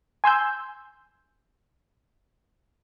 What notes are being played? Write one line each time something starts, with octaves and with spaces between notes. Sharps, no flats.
G#5 C6 E6 G6